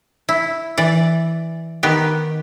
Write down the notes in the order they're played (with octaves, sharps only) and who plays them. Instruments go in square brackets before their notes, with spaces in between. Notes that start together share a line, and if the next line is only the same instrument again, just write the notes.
[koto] E4
E3 D5
D#3 B3 G4